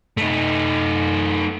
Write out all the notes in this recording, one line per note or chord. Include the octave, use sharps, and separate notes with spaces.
A3 D#4